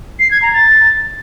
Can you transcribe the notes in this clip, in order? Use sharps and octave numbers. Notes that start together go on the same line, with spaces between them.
C7
G#6
A#5
A6